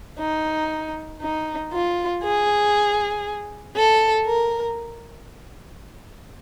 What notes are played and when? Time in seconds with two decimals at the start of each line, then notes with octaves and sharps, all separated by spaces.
0.19 D#4
1.21 D#4
1.72 F4
2.23 G#4
3.76 A4
4.26 A#4